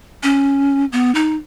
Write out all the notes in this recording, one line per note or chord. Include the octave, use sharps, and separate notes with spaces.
C#4
B3
D#4